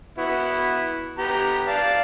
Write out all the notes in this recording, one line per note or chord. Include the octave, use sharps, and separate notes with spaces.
B3 E4 F#4
B3 G4 A#5
D5 F5 A5